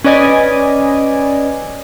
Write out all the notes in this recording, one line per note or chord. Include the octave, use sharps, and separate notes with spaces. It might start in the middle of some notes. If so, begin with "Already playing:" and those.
C#4 B4 D5 D#5 G#5